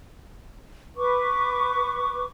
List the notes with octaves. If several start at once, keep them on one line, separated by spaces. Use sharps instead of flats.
B4 C#6 D6